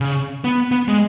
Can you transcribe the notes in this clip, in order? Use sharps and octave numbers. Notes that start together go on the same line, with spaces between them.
C#3
B3
B3
G#3